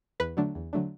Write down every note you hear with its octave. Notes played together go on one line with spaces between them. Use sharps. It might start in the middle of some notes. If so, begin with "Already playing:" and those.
E2 B4
D3 F#3 A3 D4
E2
D3 F#3 A3 D4